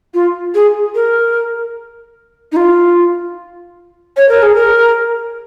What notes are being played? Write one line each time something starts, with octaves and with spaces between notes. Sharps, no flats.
F4
G#4
A#4
D#4
F4
C#5
A#4
G#4
A#4